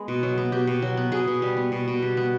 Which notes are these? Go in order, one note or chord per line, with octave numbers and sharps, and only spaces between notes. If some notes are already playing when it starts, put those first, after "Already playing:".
Already playing: G#3 B3
B2
F#3
B3
B2 G4
B2
F#3
B3
B2 G#4
B2
G3
B3
B2
B2
G3
B3